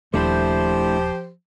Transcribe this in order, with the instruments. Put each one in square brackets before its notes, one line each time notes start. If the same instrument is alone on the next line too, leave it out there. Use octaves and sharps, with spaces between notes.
[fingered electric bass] D#1 [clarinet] F3 [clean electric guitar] A3 D4 E4 [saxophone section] G4 C5